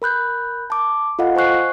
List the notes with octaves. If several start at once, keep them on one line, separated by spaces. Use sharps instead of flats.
A#4 B5 F#6 G6
A5 D6
F4 A4 D#5 F5 F#5
C5 G#5 C#6 F#6 C7